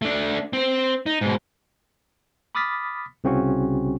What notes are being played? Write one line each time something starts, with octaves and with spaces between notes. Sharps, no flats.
A3 D4
C4 C5
D#4
G#2 B2
B5 D6 D#6 F6 A6 B6
C2 C#3 C4 C#4 F#4